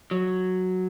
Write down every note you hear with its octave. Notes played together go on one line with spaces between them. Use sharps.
F#3